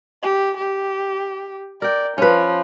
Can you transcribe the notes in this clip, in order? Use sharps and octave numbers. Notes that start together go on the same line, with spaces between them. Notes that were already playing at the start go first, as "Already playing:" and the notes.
G4
G4
A#4 D5 G5
F3 C#4 B4